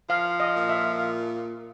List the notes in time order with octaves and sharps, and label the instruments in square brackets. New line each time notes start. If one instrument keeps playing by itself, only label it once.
[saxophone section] F3 [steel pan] F5
[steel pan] D#5
[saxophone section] A#2
[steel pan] E5